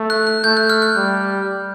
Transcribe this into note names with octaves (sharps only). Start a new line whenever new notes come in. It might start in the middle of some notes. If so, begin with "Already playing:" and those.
Already playing: A3
F#6
F#6
A3 G6
F#6
F6
F#6
G3